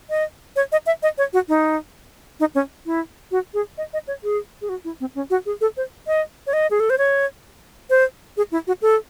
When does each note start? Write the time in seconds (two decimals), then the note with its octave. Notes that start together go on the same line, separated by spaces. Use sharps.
0.10 D#5
0.56 C#5
0.72 D#5
0.86 E5
1.03 D#5
1.18 C#5
1.33 F#4
1.48 D#4
2.40 D#4
2.55 C#4
2.86 E4
3.31 F#4
3.54 G#4
3.78 D#5
3.93 D#5
4.07 C#5
4.24 G#4
4.61 G#4
4.69 F#4
4.84 E4
5.00 C4
5.15 C#4
5.30 F#4
5.46 G#4
5.61 A4
5.77 C5
6.07 D#5
6.47 C#5
6.53 D#5
6.71 G#4
6.80 A4
6.90 C5
6.98 C#5
7.90 C5
8.37 G#4
8.52 E4
8.67 F#4
8.82 A4